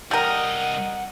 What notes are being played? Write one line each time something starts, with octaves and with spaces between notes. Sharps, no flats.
C2 G3 A#4 D#5 F#5